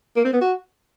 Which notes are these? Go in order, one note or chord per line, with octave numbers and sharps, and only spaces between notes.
A#3
C4
B3
F#4